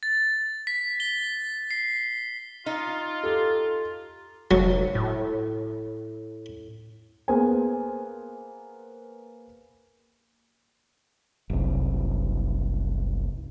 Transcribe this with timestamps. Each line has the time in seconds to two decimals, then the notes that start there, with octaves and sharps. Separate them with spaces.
0.03 A6
0.67 B6
1.00 G7
1.71 C7
2.66 D#4 F4
3.24 G4 A4
4.51 F1 F#3
4.95 A2
7.28 A#3 B3 G#4 C5 G#5
11.50 F#1 C2